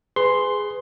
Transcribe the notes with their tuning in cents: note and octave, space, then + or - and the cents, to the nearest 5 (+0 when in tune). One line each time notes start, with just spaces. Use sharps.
G#4 +0 B4 +25 C6 +0